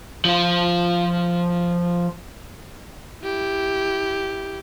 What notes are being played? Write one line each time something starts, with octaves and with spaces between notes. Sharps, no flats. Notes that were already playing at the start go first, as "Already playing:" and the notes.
F3 F4
E4 G4